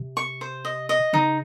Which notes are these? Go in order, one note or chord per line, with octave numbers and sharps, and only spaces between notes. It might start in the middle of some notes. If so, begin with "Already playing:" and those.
Already playing: C3
C#6
C5
D#5
D#5
C#3 D#4